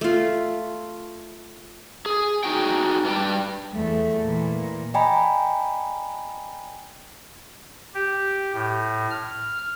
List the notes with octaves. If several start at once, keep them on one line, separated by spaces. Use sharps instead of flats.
A3 F4
G#4
D#4 F#4 G#4 G5
G2 G3 D4 G5
E2 A3
A#2 E3
D5 D#5 G5 G#5 A#5 B5
G4
A2
F6